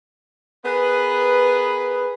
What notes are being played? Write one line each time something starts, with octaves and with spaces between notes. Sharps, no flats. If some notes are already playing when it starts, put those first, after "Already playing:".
B3 G#4 A#4 B4